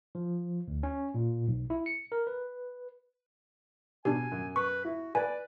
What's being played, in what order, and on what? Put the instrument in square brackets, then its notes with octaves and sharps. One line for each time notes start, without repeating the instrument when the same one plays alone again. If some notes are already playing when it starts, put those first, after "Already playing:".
[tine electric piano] F3
D2
C#4
A#2
B1
E4
C#7
A#4
B4
[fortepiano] B2 [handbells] D4 G4 [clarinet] G#5
[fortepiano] F#2
[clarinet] B4 [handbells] C#6
[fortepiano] E4 [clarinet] F#4
[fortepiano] B4 [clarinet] D5 [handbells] G#5